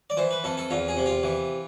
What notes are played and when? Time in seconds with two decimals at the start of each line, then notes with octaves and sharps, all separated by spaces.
0.10 D5
0.17 E3 C5
0.31 B4
0.44 F2 A4
0.57 A4
0.71 E2 F4
0.88 G#4
0.97 C3
1.06 F4
1.23 E3